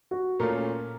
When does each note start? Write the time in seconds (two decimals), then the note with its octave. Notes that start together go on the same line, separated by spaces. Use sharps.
0.11 F#4
0.39 A#2 A3 C#4 F4 A#4